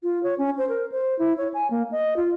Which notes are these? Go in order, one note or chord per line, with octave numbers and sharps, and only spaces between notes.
F4
C#5
C#4
C5
A#4
C5
E4
C#5
G#5
A#3
D#5
F4